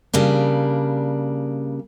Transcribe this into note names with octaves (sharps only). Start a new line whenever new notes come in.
C#3 G3 A#3 D4